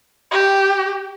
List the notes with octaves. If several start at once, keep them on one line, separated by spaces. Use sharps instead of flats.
G4